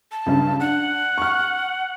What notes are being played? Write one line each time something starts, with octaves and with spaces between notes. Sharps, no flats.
A5
C#2 G2 C#3
D4 F#5
C#6 F6